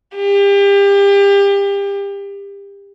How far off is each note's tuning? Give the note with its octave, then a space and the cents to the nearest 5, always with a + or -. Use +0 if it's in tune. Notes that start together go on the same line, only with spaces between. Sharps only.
G4 +30